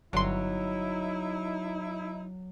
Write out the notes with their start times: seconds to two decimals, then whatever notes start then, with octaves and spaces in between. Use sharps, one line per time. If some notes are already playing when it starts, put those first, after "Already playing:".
0.13 G1 F#3 D#4 E4 C6